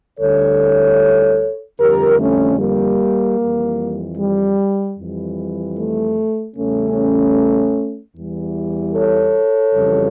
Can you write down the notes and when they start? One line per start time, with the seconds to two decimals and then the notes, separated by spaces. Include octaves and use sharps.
0.20 D2 D3 G3 A4 C#5
1.79 F2 D3 G3 G4 A#4
2.19 A3 C#4
2.59 G3 A#3
3.39 F2 E3 G3
4.18 G3
4.98 F2 E3 G3
5.77 A3
6.56 E2 C#3 G3 A3 C#4
8.15 E2 E3 G3
8.95 A4 C#5
9.75 F2 C#3 E3 G3